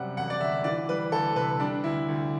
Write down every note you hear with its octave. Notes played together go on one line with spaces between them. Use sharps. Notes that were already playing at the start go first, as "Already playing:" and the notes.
Already playing: F#2 C3 G3 F#5
E1 F#5
D5
D2 E5
E3 D5
G3 B4
D2 A4
C3 B4
G3 D4
D2 E4
D2